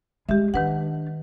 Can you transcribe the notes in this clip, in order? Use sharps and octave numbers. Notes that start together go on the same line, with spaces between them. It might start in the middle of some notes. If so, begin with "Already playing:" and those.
G#3 G4 E5
D#3 D4 B4 F#5